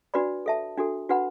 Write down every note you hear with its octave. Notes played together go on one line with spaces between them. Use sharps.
D4 F#4 B4 D5 B5
A4 E5 A5
D4 F#4 A4
D4 F#4 B4 F#5 B5